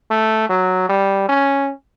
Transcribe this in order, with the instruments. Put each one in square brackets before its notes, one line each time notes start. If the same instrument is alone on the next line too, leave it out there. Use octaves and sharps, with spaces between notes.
[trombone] A3
F#3
G3
C#4